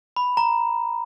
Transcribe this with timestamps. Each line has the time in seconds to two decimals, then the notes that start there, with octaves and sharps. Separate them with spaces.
0.16 B5
0.37 A#5